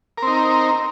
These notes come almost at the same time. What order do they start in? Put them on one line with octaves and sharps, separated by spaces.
A#4 C4 D#4